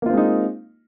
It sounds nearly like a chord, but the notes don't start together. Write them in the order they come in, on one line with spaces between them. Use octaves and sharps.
A#3 F4 C4 G#3 D#4